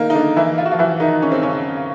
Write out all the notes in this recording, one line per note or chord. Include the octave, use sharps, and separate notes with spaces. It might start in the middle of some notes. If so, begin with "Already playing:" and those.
Already playing: D#3 A#3 D#4
D#4
D3 D4
E3 E4
F4
F#4
F3 F4
E3 E4
D#3 D#4
C#4
C4
C#3 C#4